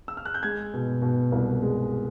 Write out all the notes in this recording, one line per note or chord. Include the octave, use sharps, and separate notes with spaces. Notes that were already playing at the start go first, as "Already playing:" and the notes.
E6
F6
F#6
G6
G#3 G#6
B2
B2
C2
G#3